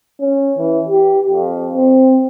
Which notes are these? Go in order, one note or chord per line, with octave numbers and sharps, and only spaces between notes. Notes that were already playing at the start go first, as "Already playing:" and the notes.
C#4
E3
G4
F2
C4